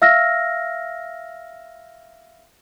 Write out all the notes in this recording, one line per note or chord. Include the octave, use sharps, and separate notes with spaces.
E5 F5 E6 F6 A#6